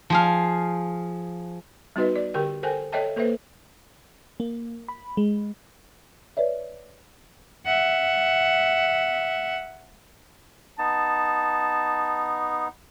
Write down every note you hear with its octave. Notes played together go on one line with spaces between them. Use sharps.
F3 G#4 F5
G3 B3 D#4 F#4 B4 D#5
D5
D3 G4 A#4 G5
A4 A#4 C5 G5 G#5
A4 C#5 D#5 E5 G5 A5
A#3 A4 B4 C5 E5
A#3
B5
G#3
B4 C#5 D5 E5
E5 F#5
B3 D#4 A5